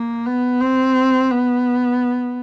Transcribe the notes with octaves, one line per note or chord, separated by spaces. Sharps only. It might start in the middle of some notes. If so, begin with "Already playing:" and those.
Already playing: A#3
B3
C4
B3